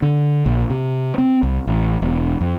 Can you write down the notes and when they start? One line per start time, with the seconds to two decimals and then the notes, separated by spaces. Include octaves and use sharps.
0.02 D3
0.46 A#1
0.70 C3
1.18 C4
1.43 C2
1.67 A1
2.02 E1
2.41 F2